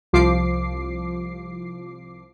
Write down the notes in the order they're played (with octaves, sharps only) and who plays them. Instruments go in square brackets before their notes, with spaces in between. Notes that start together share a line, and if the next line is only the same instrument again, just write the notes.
[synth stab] C2 F3 D6 C7